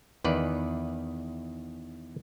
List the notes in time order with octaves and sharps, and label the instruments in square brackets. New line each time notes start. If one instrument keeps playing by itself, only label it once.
[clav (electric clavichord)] E2 D#3 B4 D5